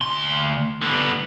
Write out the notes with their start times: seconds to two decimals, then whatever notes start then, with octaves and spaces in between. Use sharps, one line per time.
0.01 D2 C6
0.82 D3 B3